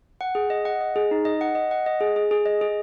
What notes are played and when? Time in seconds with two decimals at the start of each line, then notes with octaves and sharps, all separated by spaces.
0.21 F#5
0.35 G#4
0.50 D#5
0.65 F#5
0.81 D#5
0.96 G#4
1.11 D#4
1.25 D#5
1.41 F#5
1.55 D#5
1.71 F#5
1.86 D#5
2.01 G#4
2.16 G#4
2.31 G#4
2.46 D#5
2.61 G#4